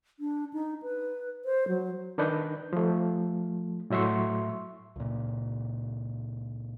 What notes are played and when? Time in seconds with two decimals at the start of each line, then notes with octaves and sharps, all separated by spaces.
0.20 D4
0.53 D#4
0.82 B4
1.45 C5
1.68 F#3
2.18 D#3 D4 B4 G6
2.73 F3 A3
3.90 A2 F#3 E5 C6 C#6
4.96 C#2 A#2